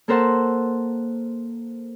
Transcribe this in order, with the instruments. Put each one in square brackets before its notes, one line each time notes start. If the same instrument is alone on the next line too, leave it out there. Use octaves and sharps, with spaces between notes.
[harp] A#3 A4 A#4 C5 F#5 A5